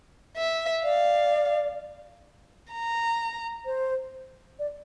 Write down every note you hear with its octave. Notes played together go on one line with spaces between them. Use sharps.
E5
D5 F5
A#5
C5
D5